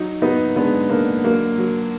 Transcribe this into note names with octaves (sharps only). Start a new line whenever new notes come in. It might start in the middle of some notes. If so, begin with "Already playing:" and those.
Already playing: F#3 D#4
F#3 B3 D#4
D3 G#3 B3
D3 A#3
F#3 A#3
F#3